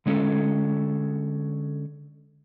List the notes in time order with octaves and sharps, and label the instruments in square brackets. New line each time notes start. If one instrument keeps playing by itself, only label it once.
[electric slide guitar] D3 G#3 C#4 A4